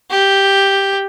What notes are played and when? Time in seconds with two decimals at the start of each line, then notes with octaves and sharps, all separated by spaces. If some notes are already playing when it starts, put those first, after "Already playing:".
0.11 G4